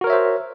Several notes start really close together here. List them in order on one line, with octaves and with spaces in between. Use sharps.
F#4 A#4 C#5 E5 C5